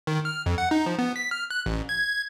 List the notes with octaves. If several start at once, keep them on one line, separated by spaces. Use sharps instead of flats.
D#3
F6
F2
F#5
D#4
F3
B3
B6
F6
F#6
A1
G#6